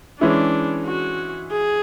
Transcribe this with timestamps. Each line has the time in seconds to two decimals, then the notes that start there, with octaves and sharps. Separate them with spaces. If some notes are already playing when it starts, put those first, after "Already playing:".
0.20 E3 G#3 C#4 D4 E4
0.86 F#4
1.52 G#4